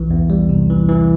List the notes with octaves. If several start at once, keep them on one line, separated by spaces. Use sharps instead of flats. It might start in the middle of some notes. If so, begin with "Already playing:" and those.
Already playing: B1 E3
E2
G3
C3
E3
E3